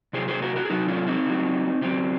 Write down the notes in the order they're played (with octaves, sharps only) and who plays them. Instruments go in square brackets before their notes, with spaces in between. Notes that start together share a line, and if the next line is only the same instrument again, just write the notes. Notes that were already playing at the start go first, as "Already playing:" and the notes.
[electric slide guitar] C3 F#3 G#4 C5
G#4 C5
F#4 A#4
F#4 A#4
G#4
C3 F#3 D#4 F#4
C#4 F4
C4 D#4
C#3 F#3
C#3 F#3 C4